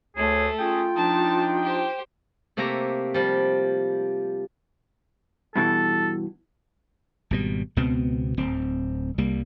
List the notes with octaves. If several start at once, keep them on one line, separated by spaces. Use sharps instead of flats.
D2 A3 G#4 C#5
C#4 F4 G#4 G5
F3 D4 D#4 A5
G4 C5
C3 A3 A#3 G4 E5 A#5
F3 G3
G2 B2 E3 A4
G#1 B2 G3
C#2 B2 B3 C4
D1 C4
C2 G3 A#3